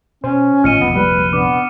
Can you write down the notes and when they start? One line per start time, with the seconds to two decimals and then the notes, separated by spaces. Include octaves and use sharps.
0.24 B2 C#4 C5
0.64 G#1 A2 B3 F4 D#5 F6 C#7 D#7
0.81 F1 A#1 B3
0.94 A#2 G3 G#3 B4
1.33 C3 B3 D4 B4 D6